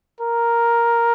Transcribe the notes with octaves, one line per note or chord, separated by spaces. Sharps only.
A#4